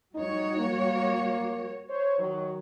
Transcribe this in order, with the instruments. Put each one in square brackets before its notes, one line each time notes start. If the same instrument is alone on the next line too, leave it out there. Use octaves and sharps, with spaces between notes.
[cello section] G3 F#4 C#5 [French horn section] D#4
[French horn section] A#3
C5 C#5
D#3 F#3